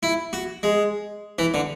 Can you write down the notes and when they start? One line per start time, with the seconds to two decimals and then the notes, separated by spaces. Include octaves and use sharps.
0.03 E4
0.33 F#4
0.63 G#3
1.39 E3
1.54 D3